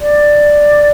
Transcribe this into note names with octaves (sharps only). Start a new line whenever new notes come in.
D5